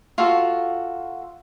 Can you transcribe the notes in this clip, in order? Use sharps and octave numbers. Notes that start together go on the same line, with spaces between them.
F4 F#4 A4